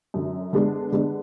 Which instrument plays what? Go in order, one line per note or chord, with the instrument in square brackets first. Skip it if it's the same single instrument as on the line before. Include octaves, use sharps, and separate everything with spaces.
[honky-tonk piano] F#2 D3 F#3
D3 G#3 B3 D4
D3 G#3 B3 D4